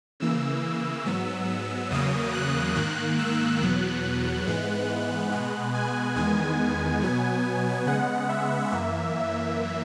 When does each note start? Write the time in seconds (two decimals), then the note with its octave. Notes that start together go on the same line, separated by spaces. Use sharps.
0.20 C#3 E3 A#3 E6
1.06 G#2 F#3 B3
1.91 E2 C#3 F#3 A#3 D#6
2.33 F#6
2.75 G#2 D#3 A#3 F#6
3.18 E6
3.61 E2 B2 F#3 B3 F#6
4.46 G#2 E3 G#3 B3
5.31 B2 G#3 B3 F#6
5.74 G#5
6.16 E2 D#3 G#3 B3 G#5
7.01 B2 F#3 B3
7.86 C#3 G#3 B3 F#5
8.29 E5
8.71 F#2 E3 A#3